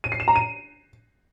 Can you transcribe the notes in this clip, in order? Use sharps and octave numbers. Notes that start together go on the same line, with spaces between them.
D#7
C7
E7
A#5
D#7